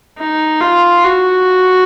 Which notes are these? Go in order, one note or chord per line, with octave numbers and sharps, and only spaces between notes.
D#4
F4
F#4